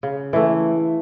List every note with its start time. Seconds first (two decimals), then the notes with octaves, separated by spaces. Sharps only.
0.03 C#3
0.33 E3 A3